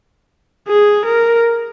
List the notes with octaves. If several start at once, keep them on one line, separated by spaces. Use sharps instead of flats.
G#4
A#4